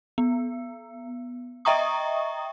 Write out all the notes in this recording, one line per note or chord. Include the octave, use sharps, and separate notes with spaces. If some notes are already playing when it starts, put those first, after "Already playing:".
B3
D#5 E5 G5 A#5 C#6 D#6